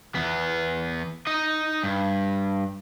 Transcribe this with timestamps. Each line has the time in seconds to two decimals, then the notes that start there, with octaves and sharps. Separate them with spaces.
0.15 E2 B3
1.27 D#4 D#5
1.83 G2